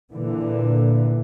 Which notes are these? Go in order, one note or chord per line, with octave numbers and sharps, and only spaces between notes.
A#2 D3 E3